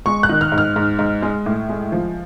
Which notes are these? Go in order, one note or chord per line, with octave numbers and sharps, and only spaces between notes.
G#3 C#6
F#6
D#3
F6
G#2
F6
G#2
G#2
G#3
A2
G#3
F3